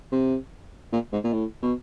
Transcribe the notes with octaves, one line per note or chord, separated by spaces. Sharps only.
C3
A#2
G#2
A#2
A2
B2